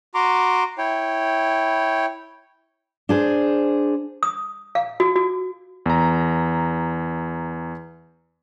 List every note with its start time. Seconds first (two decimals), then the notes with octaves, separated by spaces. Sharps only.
0.15 F#4 A#5 C6 D6
0.78 E4 C#5 G5
3.09 D4 G#4 C5
4.23 D#6
4.75 F5
5.00 F#4
5.16 F#4
5.86 E2 A#5